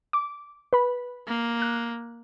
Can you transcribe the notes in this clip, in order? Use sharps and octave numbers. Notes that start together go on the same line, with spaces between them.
D6
B4 B5
A#3
F#6